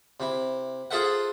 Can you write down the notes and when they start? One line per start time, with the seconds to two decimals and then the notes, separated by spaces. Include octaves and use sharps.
0.20 C3 E4
0.91 F4 G#4 A4 C5 E5 F#5